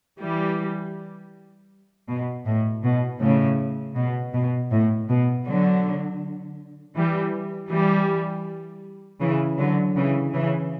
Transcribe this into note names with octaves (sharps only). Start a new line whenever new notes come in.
E3 G3
B2
A2
B2
A2 C#3
B2
B2
A2
B2
D3 F#3
E3 G3
E3 G3
C#3 E3
D3 F#3
C#3 E3
C#3 E3